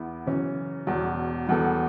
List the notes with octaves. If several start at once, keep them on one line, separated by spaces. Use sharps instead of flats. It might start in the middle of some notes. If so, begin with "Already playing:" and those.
Already playing: E2 B3 E4
F#2 C#3 E3 C#4
E1 E2 B2
E1 E2 E3 B3 A4